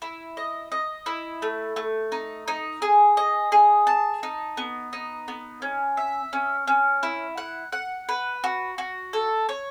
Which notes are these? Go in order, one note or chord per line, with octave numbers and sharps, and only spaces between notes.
E4
D#5
D#5
E4
A3
A3
D#4
D#4
G#4
D#5
G#4
A5
D#4
B3
D#4
B3
C#4
E5
C#4
C#4
E4
F#5
F#5
B4
F#4
F#4
A4
C#5